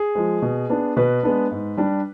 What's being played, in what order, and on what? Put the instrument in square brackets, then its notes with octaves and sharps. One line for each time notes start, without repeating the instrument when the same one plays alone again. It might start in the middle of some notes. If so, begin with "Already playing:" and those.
Already playing: [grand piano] G#4
F3 G#3
B2
B3 D4
B2 B4
G#3 B3 D4
G#2
G3 D4